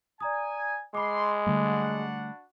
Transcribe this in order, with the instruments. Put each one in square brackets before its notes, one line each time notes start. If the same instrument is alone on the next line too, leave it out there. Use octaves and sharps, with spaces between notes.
[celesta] D5 A#5 D#6 [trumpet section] G#5
[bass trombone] G#3 [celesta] B5 D6 [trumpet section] C6
[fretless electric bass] D3 G3 A3 [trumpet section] D4 F#4 F#5